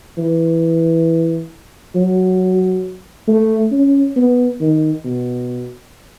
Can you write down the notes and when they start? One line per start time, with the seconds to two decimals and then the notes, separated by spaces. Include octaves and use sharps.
0.18 E3
1.95 F#3
3.28 A3
3.72 C#4
4.16 B3
4.61 D#3
5.04 B2